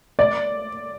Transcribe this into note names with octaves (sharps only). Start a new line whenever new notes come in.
D5